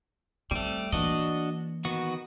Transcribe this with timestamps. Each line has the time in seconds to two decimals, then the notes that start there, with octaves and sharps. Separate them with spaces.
0.51 G3 A3 C4
0.92 E3 A#3 D4 F#4 D#5
1.85 D#3 B3 F#4